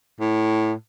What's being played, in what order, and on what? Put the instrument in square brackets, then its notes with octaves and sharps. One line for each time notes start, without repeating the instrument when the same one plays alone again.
[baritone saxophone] A2